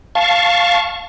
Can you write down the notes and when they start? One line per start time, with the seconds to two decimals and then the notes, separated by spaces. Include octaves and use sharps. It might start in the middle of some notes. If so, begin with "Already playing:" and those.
0.15 F5 A5 C#6